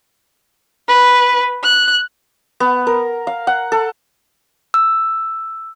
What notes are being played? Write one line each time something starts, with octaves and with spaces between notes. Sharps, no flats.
B4
F#6
B3
A#4
F5
F#5
A4
E6